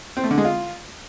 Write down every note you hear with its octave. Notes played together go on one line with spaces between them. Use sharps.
C4
A3
D3
G#3
F4